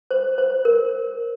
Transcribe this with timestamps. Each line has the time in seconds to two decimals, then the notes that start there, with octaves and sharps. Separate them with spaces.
0.11 C5
0.38 C5
0.65 A#4